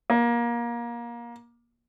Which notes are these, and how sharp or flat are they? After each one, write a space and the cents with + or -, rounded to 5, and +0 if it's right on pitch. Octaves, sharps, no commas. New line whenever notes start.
A#3 +25